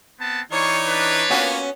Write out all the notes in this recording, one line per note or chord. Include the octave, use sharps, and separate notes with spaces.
B3 C4 A5
E3 D#4 F4 G#4 C#5 D5 C#6
D4 B4
A#3 B3 C#4 F4 F#4